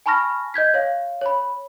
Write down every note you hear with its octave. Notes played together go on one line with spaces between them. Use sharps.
G#5 A5 B5 C#6 F6 A#6
D#5 G6 G#6 B6
C#5 F5
C#5 B5